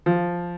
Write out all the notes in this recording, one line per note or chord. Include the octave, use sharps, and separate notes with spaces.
F3